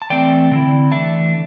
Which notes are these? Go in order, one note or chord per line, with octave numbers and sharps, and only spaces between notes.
A5
E3 A3 C4 D5 G5
D3 C4 E4
E3 A3 D4 E5 A5